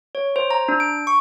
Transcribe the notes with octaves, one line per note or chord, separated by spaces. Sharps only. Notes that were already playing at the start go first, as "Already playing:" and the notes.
C#5
C5
A#5
D4
D7
C#6